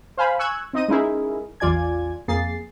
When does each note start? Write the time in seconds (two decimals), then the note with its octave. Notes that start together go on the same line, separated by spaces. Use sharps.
0.17 C5 F5 G#5 B5
0.39 G#5 C#6 E6 F#6 G#6
0.73 C4 D#4 D#5 D#7
0.89 G#3 C#4 D#4 E4 G#4 A#4
1.60 A1 E2 F4 D5 G#5 G#6
2.28 F2 A#3 G#4 A6 C7